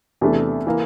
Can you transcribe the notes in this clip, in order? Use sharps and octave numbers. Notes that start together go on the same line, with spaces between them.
E2 C3 E3 A3 D4
E3 A#3